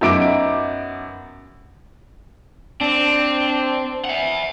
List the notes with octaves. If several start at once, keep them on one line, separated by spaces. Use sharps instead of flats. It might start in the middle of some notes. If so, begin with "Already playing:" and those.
F#2 B3 D#4 E5 D6 D7
C4 D4
E5 F#5